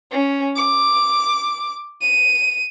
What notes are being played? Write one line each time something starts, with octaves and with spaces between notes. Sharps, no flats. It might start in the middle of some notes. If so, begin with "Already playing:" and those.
C#4
D6
D#7